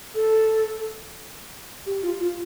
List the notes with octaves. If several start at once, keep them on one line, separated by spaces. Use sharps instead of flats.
A4
G4
F4
F4